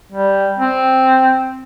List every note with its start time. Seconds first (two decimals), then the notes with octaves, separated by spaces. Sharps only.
0.12 G3
0.59 C4